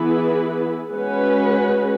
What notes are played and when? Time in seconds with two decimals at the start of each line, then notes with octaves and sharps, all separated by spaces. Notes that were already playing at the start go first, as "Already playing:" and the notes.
Already playing: E3 B3 E4 G#4 B4
0.93 G#3 C#4 F#4 B4